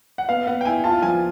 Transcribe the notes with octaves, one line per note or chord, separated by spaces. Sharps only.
F#5
B3 F5
B3 F#5
G5
E4 G#5
F4 A5
F3 G#5